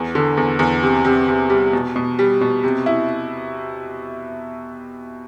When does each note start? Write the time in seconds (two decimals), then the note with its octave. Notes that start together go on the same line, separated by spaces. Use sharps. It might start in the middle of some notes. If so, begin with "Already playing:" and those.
Already playing: E2
0.15 D3
0.37 E2
0.59 E2
0.83 C3
1.05 C3
1.28 C3
1.50 G3
1.73 B2
1.96 B2
2.19 G3
2.41 B2
2.64 C3
2.86 E4